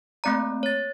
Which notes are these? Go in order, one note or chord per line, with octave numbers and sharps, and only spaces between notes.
A3 A#3 C4 D5 A#5
C#5 A6